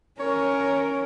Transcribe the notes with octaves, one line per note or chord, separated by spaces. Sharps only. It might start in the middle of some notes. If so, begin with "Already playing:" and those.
C#4 A#4 C#5